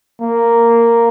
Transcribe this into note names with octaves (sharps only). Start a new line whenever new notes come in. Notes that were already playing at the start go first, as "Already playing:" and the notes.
A#3